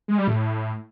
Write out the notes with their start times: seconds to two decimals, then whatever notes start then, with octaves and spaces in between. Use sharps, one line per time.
0.08 G#3
0.18 G3
0.28 A2